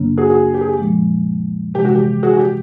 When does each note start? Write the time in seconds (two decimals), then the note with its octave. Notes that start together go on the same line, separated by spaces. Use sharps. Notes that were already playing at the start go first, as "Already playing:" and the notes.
Already playing: F#2 C#3 F#3 A#3 D4
0.17 F#4 G#4
0.30 F#4 G#4
0.54 G4
0.61 G#4
0.69 G4
0.78 A#2 F3 G#3
1.74 C3 E3 G#3 G4
1.85 F#4
1.95 G4
2.23 F#4 G#4
2.33 F#4
2.39 G4